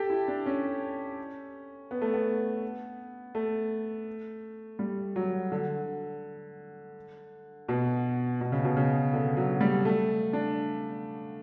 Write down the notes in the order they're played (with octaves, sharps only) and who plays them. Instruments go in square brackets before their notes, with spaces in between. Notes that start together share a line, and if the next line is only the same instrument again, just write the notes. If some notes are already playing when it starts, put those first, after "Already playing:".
Already playing: [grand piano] G4 A4
E4
D4
C#4
B3
A3
B3
A3
G3
F#3
D3
B2
B2
C#3
B2
C#3
D3
F#3
G3
A3
D4